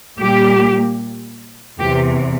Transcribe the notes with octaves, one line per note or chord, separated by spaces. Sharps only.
A#2 G3 A#3 G4
E2 C3 E3 G4